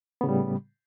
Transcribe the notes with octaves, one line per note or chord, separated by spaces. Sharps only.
A2 C#3 G3 B3